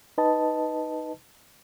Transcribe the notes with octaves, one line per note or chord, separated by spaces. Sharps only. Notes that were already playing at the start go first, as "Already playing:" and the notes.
D#4 B4 D#5 A5